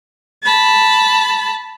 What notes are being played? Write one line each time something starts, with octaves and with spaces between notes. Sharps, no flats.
A5 B5